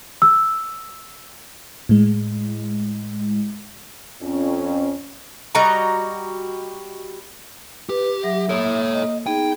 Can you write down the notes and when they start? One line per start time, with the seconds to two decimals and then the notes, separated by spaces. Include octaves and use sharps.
0.22 E6
1.89 A2 G#3
4.22 F2 C#4
5.55 G3 F#4 D#5 A#5
7.89 G4 B4
8.24 F#3 E5
8.49 A#3 A4 C#5 D#6
8.94 D#5
9.26 B3 D#4 G#4 G5